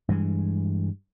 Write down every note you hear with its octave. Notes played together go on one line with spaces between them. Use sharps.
G2 E3 G#3